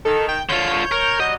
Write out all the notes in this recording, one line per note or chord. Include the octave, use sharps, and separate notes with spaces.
D#3 A4
G5
D3 F4 C#5 G6
A#4
F#3 G3 D#5